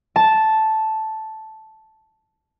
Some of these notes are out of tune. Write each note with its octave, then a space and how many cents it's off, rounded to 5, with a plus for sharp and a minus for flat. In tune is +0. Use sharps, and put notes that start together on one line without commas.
A5 -5